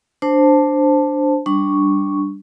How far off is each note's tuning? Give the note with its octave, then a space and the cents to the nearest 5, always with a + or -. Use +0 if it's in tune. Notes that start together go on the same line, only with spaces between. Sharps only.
D4 +0 C5 +0 A5 +0
G3 +0 D4 +0 C#6 +0